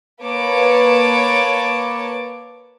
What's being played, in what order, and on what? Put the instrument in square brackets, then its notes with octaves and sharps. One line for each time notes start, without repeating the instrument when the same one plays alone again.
[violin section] A#3 B4 C#5 A5 D6